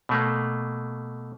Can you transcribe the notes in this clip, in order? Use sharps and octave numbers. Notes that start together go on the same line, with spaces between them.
B2 A3 A#3